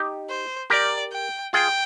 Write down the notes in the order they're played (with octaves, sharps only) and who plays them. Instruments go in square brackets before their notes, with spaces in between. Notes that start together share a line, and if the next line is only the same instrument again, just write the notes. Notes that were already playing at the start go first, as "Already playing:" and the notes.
Already playing: [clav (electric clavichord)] D#4 G4
[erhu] C5
[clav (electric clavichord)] G4 A#4 [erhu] D5
[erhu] G5
[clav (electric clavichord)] F4 G#4 [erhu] G5